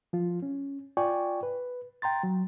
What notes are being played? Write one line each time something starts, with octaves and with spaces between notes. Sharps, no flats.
F3 F4
C#4
F4 D5 G5 G#5 C#6
B4
G5 A#5 C6 A6
F#3